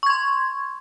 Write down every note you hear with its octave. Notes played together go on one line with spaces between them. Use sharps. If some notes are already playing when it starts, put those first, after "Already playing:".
C6 C#6 G#6